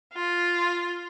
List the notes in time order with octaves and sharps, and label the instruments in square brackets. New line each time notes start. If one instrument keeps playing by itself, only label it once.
[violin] F4